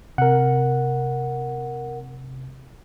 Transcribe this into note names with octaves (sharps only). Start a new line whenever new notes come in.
C3 A#4 F#5